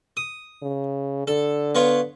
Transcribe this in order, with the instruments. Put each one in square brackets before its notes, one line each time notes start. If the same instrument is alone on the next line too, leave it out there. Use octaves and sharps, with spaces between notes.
[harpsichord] D#6
[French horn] C#3
[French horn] D3 [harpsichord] A4
[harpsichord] B3 F4 C#5